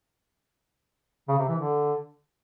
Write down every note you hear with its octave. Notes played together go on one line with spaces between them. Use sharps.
C#3
C3
E3
D3